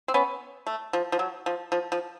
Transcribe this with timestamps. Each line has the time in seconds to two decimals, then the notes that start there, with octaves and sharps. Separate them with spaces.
0.08 C4
0.14 B3 C#4
0.67 A3
0.93 F3
1.12 F3
1.19 F#3
1.46 F3
1.72 F3
1.92 F3